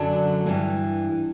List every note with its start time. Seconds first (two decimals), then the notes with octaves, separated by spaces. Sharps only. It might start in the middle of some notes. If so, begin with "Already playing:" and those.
Already playing: F#2 D3 F#3 D4
0.46 G2 E3